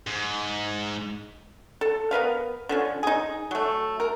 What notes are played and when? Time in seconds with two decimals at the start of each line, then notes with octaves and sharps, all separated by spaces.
0.07 G#2
1.81 A4
2.11 B3 A#4 B4 F5
2.69 D3 F3 C#4
3.03 D#4 G#4
3.51 F#3 A3
4.00 A#4